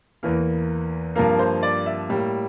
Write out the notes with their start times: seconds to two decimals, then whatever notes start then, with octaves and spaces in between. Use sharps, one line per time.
0.23 E2 E3 A#3 A#4
1.16 G2 F3 A#3 A#4
1.39 C5
1.63 D5
1.86 E5
2.09 A2 G3 A#3